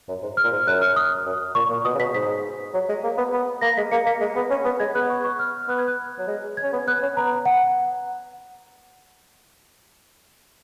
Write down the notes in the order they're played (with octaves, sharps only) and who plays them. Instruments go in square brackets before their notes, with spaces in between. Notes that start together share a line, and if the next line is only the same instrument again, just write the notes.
[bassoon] F#2
G#2
[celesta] F6
[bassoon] A#2
G#2
[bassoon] F#2 [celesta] F#6
[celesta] F6
D#6
[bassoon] F#2
[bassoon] A#2 [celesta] C#6
[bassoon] A#2
[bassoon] B2 [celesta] D#6
[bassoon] C#3
[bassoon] B2 [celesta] B6
[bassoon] G#2 [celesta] B6
[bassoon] F#3
G#3
A#3
B3
B3
[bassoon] A#3 [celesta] A#6
[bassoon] G#3 [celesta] B6
[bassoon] A#3 [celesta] C#7
[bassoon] A#3 [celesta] B6
[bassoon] G#3
B3
C#4
B3
[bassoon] G#3 [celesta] G#6
[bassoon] B3 [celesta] F#6
[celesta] C#6
C#6
F6
[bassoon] B3 [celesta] F#6
[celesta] G#6
F#6
[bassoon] F#3
G#3
[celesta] G#6
[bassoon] C#4
B3
[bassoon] B3 [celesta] F#6
[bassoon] C#4
[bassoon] B3 [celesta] A#5
[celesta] F#5